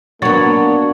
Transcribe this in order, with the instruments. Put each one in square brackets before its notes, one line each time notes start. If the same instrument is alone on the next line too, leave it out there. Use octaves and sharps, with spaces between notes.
[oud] F#3 B3 [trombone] A#3 [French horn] D4 [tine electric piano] C#6 A6